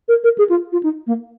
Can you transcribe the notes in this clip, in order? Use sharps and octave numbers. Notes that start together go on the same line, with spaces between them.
A#4
A#4
G#4
F4
F4
D#4
A#3